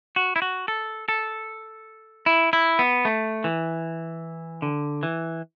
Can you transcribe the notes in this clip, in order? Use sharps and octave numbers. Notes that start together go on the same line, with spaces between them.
F#4
E4
F#4
A4
A4
E4
E4
B3
A3
E3
D3
E3